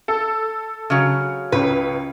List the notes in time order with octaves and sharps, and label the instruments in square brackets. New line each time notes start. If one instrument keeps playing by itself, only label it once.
[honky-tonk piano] A4
[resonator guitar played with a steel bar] C#3 F#3
[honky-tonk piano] C#2 C#4 [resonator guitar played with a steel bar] B4